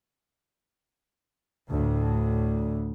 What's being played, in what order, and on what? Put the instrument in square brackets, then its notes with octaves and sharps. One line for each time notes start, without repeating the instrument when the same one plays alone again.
[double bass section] D2 A2